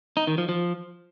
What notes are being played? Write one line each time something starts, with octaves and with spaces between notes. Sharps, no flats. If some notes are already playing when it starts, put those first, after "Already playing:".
D#4
D#3
F3
F3